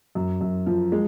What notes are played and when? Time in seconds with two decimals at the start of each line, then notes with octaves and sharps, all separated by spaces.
0.15 F#2
0.41 F#2
0.66 F3
0.92 G#3